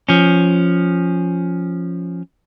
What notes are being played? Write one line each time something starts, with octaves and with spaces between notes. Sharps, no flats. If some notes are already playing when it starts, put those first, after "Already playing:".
F3 C#4